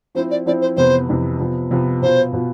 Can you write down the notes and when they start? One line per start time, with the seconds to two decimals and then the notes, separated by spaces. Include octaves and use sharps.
0.15 F3 C4 E4 C5
0.30 D5
0.46 F3 C4 E4 D5
0.61 C5
0.76 F2 C3 E3 B3 C5
1.08 F2 C3 E3 B3
1.39 C3 F3 B3
1.71 C3 F3 B3
2.02 B2 B3 F4 C5
2.33 B2 B3 F4